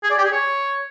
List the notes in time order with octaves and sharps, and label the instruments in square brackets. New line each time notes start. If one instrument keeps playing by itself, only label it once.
[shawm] G#4
D5
G4
G#4
C#5